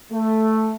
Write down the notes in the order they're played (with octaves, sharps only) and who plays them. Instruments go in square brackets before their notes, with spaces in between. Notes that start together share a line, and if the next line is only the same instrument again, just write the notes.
[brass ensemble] A3